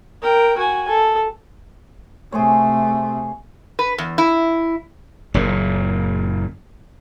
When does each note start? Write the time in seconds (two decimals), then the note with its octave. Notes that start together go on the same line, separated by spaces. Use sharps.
0.22 A#4 G5
0.57 F#4 G#5
0.89 A4
2.32 C3 A3 G#4 C5 C#5
3.79 B4
3.98 E2
4.18 E4
5.34 F#1 A#2